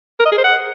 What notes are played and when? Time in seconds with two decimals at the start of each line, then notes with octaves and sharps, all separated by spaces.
0.19 A#4
0.26 D#5
0.32 G#4
0.38 C5
0.44 F#5